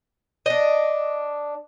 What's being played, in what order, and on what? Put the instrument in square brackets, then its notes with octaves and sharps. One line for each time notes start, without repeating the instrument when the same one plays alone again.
[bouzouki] D4 D#5